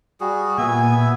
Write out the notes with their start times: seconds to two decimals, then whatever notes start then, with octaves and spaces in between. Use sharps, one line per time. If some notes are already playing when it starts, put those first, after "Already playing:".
0.21 G3 F#4 G#4
0.58 A#2 B3 E5 G#5